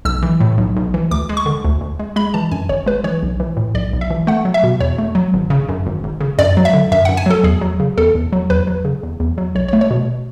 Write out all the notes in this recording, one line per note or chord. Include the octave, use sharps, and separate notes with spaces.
B1 E6
E3
A2
B1
B1
E3
D2 D6
G#3
C#6
D3
D2
D2
G#3
G#3 B5
E3 A5
F#2 G#5
G#1 C#5
G#3 B4
E3 C#5
B1
E3
A2
B1 D5
B1
E5
E3
A3 F#5
F#3
E5
B2
E2 C#5
A3
F#3
G#1
C#3
F#2
G#1
G#1
C#3
F#2 D5
F#3
E5
D3
F#2 E5
F#2 F#5
G#5
F#3 A4
E2 G#4
F#3
C#3
E2 A4
E2
F#3
E2 B4
F#3
C#3
E2
E2
F#3
B1 C#5
C#5
A3
C#5
B2